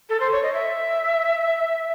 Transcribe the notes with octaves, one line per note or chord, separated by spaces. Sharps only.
A4
C5
C#5
D#5
E5